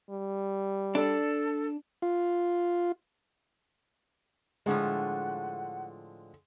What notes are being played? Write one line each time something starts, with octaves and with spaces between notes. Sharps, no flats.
G3
D4 A4
F4
A2 D3 F3 G#3 F#5